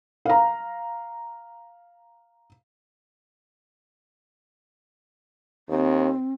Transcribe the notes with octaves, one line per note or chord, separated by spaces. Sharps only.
F5 A#5
D#2 C4